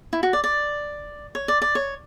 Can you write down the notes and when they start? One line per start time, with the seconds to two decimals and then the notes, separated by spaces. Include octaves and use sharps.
0.13 E4
0.23 F#4
0.33 D5
0.44 D5
1.35 C#5
1.48 D5
1.62 D5
1.75 C#5